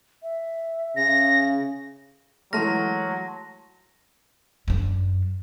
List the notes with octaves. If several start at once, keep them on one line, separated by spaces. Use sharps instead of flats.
E5
C#3 A#6
E3 F#3 G#3 A3 A5 C6 F6 A#6
F#2 D4